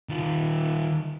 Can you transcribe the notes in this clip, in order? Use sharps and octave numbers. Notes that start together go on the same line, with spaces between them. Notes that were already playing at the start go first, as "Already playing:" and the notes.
D#3 F4